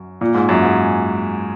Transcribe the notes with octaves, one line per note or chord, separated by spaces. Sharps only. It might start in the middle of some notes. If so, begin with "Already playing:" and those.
Already playing: F#2
A#2
G#2
F#2
G#2